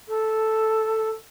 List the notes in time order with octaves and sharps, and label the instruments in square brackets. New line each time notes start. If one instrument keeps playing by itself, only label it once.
[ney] A4